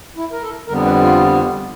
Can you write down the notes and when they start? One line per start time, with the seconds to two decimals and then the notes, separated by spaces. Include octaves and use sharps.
0.17 E4
0.32 A#4
0.42 A4
0.68 F2 D3 G3 B3 A#4
0.85 B4
1.02 F4